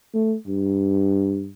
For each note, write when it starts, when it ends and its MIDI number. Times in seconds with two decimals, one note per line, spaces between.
0.14 0.36 57
0.48 1.49 43